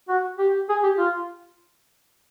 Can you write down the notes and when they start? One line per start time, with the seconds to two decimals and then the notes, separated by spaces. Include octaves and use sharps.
0.09 F#4
0.38 G4
0.69 G#4
0.83 G4
0.98 F4